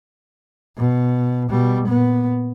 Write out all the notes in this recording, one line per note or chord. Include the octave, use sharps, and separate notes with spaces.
B2
B2 G3
A#2 B3